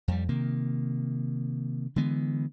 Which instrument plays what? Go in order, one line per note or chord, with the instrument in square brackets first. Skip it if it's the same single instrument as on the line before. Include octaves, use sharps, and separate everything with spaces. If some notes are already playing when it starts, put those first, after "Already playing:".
[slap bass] F2 G3
C3 D#3 A#3
D3 E3 G#3 B3